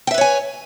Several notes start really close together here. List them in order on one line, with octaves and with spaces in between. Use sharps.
G5 E5 B4 C#5 G#5